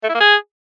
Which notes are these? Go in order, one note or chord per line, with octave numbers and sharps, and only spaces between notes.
A3
E4
A#3
G#4